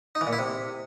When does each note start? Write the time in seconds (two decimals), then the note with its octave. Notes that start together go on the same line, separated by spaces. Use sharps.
0.15 D#4
0.21 E3
0.27 A#2
0.33 E4
0.38 C3